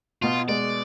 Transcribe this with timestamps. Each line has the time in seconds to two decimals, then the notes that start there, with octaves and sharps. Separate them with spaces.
0.22 B2 F4
0.49 G#3 D5